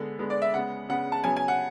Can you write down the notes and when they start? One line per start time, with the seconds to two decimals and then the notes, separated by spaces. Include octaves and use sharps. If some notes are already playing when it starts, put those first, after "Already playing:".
Already playing: D3 G#3 B3
0.19 D3 G#3 B3
0.30 D5
0.42 E5
0.53 C#3 G#3 B3 F#5
0.89 C#3 G#3 B3 F#5
1.12 A5
1.24 C#3 F#3 B3 G#5
1.37 G#5
1.48 F#5